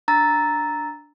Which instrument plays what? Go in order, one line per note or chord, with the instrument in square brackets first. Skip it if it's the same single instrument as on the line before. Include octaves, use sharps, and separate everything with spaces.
[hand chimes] D4 A#5 E6 A6